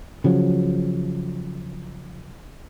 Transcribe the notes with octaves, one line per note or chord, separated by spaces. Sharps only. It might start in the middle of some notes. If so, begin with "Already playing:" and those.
C#3 F3 F#3